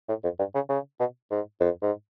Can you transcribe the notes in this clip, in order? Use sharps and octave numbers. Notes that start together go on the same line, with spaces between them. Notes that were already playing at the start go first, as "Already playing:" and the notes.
A2
F2
G2
C#3
C#3
B2
G#2
F2
G#2